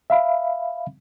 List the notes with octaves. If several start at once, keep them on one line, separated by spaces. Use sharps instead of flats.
E5 F5 B5